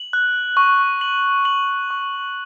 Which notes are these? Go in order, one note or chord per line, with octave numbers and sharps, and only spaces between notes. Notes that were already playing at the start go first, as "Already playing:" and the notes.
Already playing: F#7
F#6
C#6
F#7
F#7
C#6